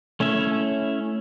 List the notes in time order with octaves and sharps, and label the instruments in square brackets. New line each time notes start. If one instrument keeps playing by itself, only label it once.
[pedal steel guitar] A3 C#4 E4 E5